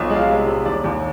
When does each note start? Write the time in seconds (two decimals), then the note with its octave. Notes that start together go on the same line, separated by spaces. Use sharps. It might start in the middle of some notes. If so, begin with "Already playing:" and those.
Already playing: B1 F3
0.10 G#3
0.16 F5
0.29 C3
0.47 C3
0.65 D#2 D5
0.84 D#2